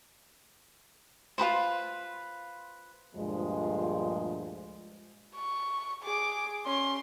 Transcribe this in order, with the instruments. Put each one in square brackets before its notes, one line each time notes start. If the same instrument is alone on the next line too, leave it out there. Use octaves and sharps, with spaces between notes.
[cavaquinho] F4 G#4 B4 C5
[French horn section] D2 G2 A#2 F3 G#3
[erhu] C#6
[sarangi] G#4 [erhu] D6
[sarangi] C#4 [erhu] C6